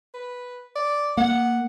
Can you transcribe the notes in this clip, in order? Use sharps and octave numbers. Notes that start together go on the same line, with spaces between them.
B4
D5
A#3 F#5